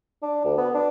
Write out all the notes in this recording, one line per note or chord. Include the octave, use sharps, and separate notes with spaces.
D4
D2
B3
D4